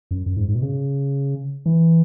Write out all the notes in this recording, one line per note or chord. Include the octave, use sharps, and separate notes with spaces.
F#2
F#2
G#2
G#2
B2
C#3
E3